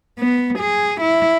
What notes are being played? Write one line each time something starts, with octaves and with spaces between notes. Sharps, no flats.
B3
G#4
E4